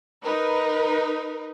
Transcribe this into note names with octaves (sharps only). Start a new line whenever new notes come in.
D#4 A#4 B4